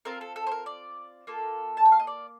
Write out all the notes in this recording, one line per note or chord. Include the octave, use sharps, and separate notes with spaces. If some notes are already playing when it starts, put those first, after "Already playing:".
C4 F4 A4 A#4
A4
A4
C5
A#4
D5
A#3 F4 A4
A5
G5
F5
D#5
D5